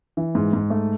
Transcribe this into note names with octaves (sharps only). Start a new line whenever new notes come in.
E3
G#2
G#2
A3